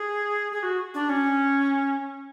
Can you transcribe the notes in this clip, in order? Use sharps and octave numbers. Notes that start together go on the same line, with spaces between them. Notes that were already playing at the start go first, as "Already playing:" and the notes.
Already playing: G#4
G#4
F#4
D4
C#4